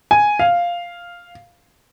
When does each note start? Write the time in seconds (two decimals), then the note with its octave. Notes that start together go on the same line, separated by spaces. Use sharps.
0.11 G#5
0.39 F5